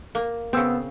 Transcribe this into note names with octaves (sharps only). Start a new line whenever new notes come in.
A#3
C#3 B3 C4 E6